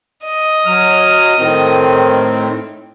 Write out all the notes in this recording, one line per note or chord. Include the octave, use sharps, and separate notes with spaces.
D#5
F#3 F6
A2 D#3 C4